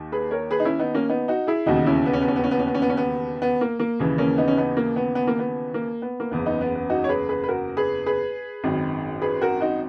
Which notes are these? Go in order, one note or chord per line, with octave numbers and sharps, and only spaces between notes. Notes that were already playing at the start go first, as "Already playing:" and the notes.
Already playing: D#2 D#3
G#4 B4
A#4 C#5
G#4 B4
D#4
C#4 E4
B3 D#4
A#3 C#4
B3 D#4
D#4 F#4
E4 G#4
E1 D#2 C#3 D#4 F#4
C#4 E4
B3
C#4
B3
C#4
B3
C#4
B3
C#4
B3
C#4
B3
C#4
B3
B3
A#3
A#3
D#2 C#3 E3
A#3 C#4
B3 D#4
C#4
B3 D#4
A#3
B3
B3
A#3
B3
A#3
B3
A#3
F#1 E2 C#3 B3
B3 D#4
B3
B3
D#4 F#4
C#5
G#4 B4
G#4 B4
B4
F#4 A#4
G#4 B4
G#4 B4
G#1 F#2 D#3
G#4 B4
F#4 A#4
D#4 F#4